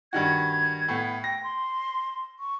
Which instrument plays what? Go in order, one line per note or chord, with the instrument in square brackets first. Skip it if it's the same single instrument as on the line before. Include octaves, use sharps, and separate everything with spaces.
[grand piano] G2 D#3 F#4 [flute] G#6
[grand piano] A2 B3
[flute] G5 [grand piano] A#6
[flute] C6
C#6